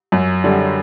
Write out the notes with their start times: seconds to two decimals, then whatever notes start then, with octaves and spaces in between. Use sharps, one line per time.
0.12 F#2
0.44 D3 G3